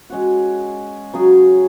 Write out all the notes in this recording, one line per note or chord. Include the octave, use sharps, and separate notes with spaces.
G#3 C#4 F#4
C#3 F#3 C#4 G#4